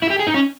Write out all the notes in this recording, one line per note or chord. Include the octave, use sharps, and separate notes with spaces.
E4
G4
G#4
D#4
C#4